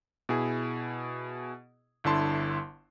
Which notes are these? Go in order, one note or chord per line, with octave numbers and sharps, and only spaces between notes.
B2 E4 G#4
G1 D3 E4 A5 C6